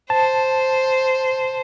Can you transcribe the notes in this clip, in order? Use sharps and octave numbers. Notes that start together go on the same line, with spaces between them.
C5 A5